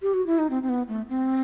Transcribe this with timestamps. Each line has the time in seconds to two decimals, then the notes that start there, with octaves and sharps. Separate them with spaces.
0.02 G4
0.14 F#4
0.27 E4
0.39 D#4
0.50 C4
0.63 C4
0.69 B3
0.88 A3
1.09 C4